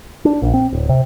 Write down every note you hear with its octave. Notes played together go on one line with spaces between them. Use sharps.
D4
A#1
C4
D1
C3